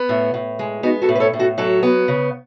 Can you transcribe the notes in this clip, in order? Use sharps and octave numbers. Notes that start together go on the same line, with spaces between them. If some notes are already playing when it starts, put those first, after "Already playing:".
Already playing: B3
A2
A2
G#3
B3 D#4 F#4
F#4 A4
A2
B4
A4 C#5
A2
F#4 A4
F#3 F#4 A4
B3
C#3